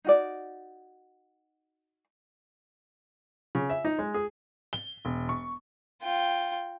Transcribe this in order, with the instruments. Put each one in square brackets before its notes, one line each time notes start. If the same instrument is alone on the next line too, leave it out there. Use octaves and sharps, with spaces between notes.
[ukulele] D#4 F#4 D5
[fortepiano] C#3
E5
D#4
G#3
G#4
[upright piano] G7
E1
C#6
[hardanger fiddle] F4 G5